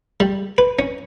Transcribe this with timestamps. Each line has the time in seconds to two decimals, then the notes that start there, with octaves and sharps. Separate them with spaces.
0.20 G3
0.58 B4
0.79 C#4